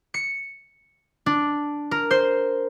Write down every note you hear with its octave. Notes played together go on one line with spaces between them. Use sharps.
C#7
D4
A#4
C5